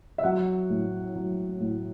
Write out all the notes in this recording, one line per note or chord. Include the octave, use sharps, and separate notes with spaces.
E5
F#3 F#5
A2
F#3
A2